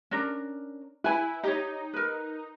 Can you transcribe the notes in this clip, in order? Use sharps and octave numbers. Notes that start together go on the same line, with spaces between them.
C#4 D4 A#4
E4 B4 G#5
D#4 G4 C#5
A#4 B4